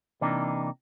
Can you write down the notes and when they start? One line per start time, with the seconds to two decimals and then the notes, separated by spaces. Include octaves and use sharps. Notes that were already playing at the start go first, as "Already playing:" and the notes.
0.21 C3 E3 A#3 D4 D#4